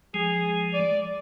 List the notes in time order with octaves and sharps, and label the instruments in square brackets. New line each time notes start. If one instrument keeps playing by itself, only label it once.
[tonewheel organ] F3 G#3 [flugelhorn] G#4
[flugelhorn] D5